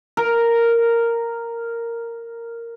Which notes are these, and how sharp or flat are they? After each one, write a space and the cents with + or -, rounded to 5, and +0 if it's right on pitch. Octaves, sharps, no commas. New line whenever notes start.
A#4 -5